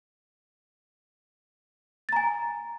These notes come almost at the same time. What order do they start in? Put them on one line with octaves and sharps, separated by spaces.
A6 A#5 G#5